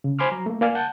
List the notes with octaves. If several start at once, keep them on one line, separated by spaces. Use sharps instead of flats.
C#3
C5 G#5 B5 C6 D6 F6
F#3 A#5
A3 A#3
A#3 A#4 D5 F5 G#5 F6
F#5 A5 G6